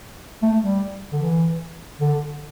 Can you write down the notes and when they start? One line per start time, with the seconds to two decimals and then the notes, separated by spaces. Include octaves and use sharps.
0.43 A3
0.63 G3
1.12 D3
1.22 E3
2.00 D3